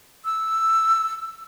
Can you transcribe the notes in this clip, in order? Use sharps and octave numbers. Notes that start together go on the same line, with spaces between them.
E6